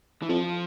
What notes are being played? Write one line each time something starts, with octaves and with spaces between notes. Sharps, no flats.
E3
F2 F3